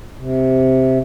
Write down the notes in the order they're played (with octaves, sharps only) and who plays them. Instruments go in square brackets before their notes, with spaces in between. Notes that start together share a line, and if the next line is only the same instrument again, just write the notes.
[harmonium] C3